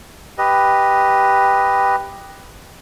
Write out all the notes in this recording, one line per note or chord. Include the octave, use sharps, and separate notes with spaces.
G4 B4 D#5